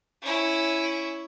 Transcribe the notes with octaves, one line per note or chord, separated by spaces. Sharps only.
C#4 E4